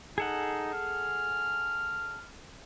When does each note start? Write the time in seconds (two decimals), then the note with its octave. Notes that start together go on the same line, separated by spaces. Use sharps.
0.18 D#4 G#4 A4 F#5
0.74 F6